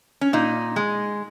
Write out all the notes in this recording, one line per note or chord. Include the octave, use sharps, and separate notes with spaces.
C#4
A#2 D#4
G#3